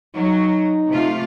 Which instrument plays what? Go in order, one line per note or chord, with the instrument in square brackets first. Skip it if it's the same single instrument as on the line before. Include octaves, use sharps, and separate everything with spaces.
[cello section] F#3 [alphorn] D#4
[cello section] C3 A3 F4